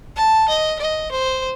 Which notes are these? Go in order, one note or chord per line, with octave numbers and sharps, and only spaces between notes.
A5
D#5
D#5
C5